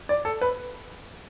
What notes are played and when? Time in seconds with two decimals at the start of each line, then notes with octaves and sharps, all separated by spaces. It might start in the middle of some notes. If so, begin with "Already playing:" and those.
0.09 D5
0.25 A4
0.41 B4